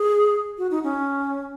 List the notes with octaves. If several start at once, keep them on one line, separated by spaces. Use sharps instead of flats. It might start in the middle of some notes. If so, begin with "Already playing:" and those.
Already playing: G#4
F#4
D#4
C#4